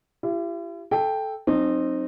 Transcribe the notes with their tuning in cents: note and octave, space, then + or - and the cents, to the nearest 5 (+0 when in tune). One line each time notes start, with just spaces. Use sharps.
E4 +45 G4 +0
A4 -10 G5 +5
F#3 +0 C4 +15 D#4 -20